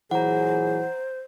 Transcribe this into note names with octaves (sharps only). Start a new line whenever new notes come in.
A#2 E3 F#3 G#4 C5 F#5 A#5